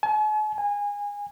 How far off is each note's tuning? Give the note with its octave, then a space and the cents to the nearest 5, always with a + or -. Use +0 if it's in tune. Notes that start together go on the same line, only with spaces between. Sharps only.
G#5 +45
G#5 -25